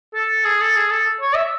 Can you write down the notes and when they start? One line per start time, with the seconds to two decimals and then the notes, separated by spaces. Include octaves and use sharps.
0.14 A4
0.45 G#4
0.60 A4
0.75 G#4
0.90 A4
1.21 C#5
1.35 E5